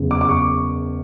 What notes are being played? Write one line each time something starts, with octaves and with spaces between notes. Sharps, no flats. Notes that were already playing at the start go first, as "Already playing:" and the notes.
Already playing: F#1 E2 C#3
D6
D6
C#6